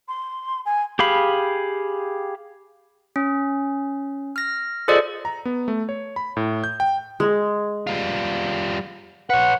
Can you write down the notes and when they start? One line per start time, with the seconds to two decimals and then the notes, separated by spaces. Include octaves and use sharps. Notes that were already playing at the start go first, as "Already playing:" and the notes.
0.08 C6
0.65 G#5
0.99 G4 G#4 F5 B5
3.16 C#4
4.36 F6 A#6
4.88 F4 G#4 A4 C5 D5 D#5
5.25 A#5
5.45 B3
5.68 A3
5.89 C#5
6.16 B5
6.37 A2
6.64 G6
6.80 G5
7.20 G#3
7.87 G3 F4
9.30 B4 C#5 F#5